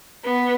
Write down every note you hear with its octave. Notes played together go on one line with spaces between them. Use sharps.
B3